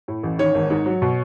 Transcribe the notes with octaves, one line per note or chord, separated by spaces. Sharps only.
A2
A1
D#3 C#5
G#1
G#2
F#3
B2